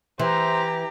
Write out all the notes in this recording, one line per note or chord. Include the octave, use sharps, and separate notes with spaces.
E3 G4 C5 A#5